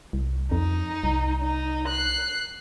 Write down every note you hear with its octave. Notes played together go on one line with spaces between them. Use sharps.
C2
F2 D#4
C2
D#4
F#6 C7